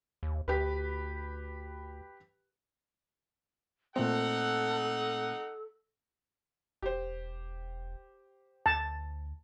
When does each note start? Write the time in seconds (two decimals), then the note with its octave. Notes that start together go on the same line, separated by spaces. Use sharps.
0.23 D#2
0.48 D2 G4 B4
3.96 A#2 A3 C4 D#4 A4 F#5
6.82 E1 G4 C5
8.66 D2 A5